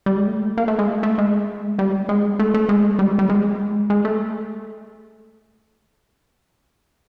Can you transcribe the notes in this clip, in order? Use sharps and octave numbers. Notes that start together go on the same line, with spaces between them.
G3
G#3
A3
A#3
A3
G#3
A3
A3
G#3
G3
G#3
A3
A3
G#3
G3
G#3
G3
G#3
G#3
A3